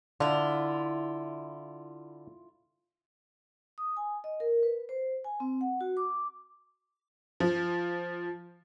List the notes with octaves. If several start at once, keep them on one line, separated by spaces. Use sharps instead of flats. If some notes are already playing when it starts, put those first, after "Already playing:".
D3 E4 F4
D#6
G#5
D#5
A#4
B4
C5
G#5
C4
F#5
F#4
D6
F3